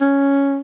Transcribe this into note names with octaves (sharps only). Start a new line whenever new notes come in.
C#4